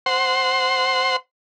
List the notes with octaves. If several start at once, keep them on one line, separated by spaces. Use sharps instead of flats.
C5 F#5 C6